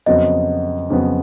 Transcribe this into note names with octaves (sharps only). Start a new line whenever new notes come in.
F2 C#3 F#3 B3 D#5
F2 C#3 F#3 B3